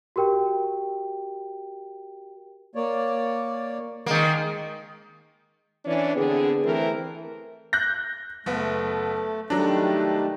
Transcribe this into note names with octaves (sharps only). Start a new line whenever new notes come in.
F#4 G4 A#4 G5
A#3 C#5 D5
D#3 G#3 A#3
E3 C#4 D4
D3 B3 C4 G#4
E3 A3 C4 A#4
F#6 G6 A#6
F#1 A3 B3
D#3 F#3 G3 A3 D4